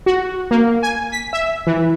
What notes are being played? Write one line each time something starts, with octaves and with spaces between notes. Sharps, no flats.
F#4
A#3
G#5
B6
E5
E3